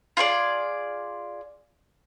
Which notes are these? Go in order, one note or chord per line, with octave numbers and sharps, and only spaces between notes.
F4 G#4 C#5 D5